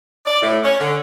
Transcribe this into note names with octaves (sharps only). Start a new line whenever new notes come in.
D5
A2
C#4
D3